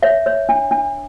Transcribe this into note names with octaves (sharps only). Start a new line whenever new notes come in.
C#5 E5
C#5
D4
D4